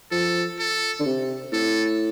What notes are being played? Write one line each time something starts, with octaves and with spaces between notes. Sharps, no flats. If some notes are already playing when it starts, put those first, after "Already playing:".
F3 A4
A4
D3
C3
A2 A4